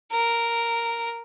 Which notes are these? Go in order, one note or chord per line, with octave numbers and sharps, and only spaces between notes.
A#4